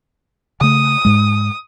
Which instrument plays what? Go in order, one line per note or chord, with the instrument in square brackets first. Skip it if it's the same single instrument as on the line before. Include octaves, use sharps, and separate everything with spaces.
[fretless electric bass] C#3 A3 [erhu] D#6
[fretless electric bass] G#2 G#3